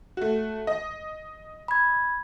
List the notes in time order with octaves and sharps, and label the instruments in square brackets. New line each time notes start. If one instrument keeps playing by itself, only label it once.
[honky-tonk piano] A3 F#4
D#5
[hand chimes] B5 G#6